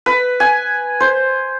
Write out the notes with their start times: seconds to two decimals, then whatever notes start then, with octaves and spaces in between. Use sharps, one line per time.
0.06 B4
0.40 G#5
1.00 C5